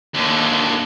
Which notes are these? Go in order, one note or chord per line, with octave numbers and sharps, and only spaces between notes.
D#2 D3